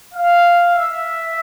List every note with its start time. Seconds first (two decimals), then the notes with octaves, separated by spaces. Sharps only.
0.14 F5
0.76 E5